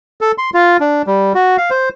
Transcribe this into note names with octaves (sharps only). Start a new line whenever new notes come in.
A4
C6
F4
D4
G3
F#4
F5
C5